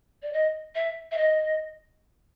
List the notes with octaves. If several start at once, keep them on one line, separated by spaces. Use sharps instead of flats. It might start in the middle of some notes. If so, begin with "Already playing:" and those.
D5
D#5
E5
E5
D#5